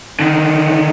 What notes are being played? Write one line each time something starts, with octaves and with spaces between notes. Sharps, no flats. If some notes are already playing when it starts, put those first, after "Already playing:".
D3 D#3